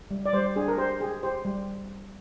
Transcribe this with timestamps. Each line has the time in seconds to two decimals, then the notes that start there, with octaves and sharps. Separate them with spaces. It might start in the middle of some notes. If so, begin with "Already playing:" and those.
0.11 G3
0.26 D5
0.33 G3 C5
0.56 D4 G#4
0.68 A#4
0.78 G4 C5
1.00 G4 G#4
1.23 G4 C5
1.45 G3